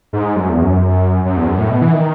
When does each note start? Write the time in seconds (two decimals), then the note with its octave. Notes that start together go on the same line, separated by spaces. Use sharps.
0.13 G#2
0.36 F#2
0.49 E2
0.63 F#2
1.25 F#2
1.37 E2
1.47 F#2
1.59 A2
1.70 B2
1.82 E3
1.93 D#3